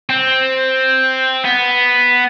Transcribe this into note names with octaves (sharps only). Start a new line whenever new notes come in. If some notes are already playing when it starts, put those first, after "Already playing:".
C4
B3